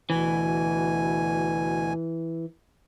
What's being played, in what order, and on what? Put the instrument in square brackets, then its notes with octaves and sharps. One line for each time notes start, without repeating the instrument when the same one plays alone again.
[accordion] D2 B2 G#5 [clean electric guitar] E3